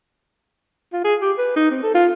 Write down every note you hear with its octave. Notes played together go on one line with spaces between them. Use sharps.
F4
G#4
G4
B4
D#4
C4
A4
F4